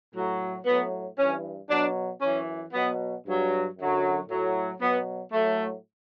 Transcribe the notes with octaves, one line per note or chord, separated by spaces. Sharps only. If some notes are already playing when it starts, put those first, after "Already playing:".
A2 F#3
A2 F#3 B3
G2 E3 C#4
B2 F#3 D4
F#2 E3 C#4
B2 F#3 B3
G2 F#3
F#2 D3 F#3
A2 F#3
B2 F#3 B3
A2 F#3 A3